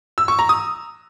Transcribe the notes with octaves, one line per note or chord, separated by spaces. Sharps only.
E6
C#6
A#5
D#6